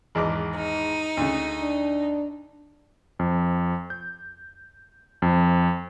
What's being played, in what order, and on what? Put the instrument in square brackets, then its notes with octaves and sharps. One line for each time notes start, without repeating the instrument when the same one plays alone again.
[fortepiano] G#1 E2 D6
[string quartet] D#4
[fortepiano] D2 C#3
[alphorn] D4
[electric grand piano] F2
G6
F2